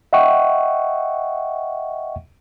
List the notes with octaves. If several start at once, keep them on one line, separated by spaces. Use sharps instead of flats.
D#5 E5 F#5 G5 C#6